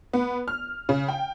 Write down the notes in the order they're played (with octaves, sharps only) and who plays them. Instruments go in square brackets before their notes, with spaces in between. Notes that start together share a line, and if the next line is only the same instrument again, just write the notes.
[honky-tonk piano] B3
F6
C#3
G5